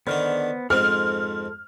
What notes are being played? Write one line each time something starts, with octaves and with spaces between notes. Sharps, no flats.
D3 D#3 B3 D4 C5 F6
F2 G#2 C4 A4 C6 F6